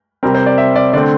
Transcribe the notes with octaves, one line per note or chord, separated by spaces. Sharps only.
C3 G3 C4 A#4
C5
D5
E5
D5
D3 A3 C4 D5